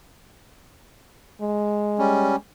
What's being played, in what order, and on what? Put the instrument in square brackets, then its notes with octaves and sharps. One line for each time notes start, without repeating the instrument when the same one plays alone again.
[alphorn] G#3
[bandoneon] G3 C#4